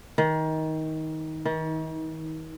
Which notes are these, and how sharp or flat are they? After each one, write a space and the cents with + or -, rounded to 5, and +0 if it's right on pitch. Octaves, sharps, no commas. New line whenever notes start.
D#3 +20
D#3 +40